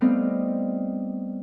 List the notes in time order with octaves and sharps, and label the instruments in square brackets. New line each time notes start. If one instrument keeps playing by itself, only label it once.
[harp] G3 A3 B3 C4 D#4 F5